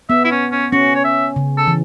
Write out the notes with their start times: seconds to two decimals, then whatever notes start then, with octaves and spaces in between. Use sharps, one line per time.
0.09 B3 E5
0.25 E4
0.31 C#4
0.52 C#4
0.72 C#4 F#4
0.95 C#5
1.04 E5
1.36 C#3
1.57 A4
1.67 E3